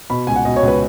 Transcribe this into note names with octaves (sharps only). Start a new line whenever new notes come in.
B2 B5
C#2 G#5
F#5
B2 D#5
C#5
C#2
B4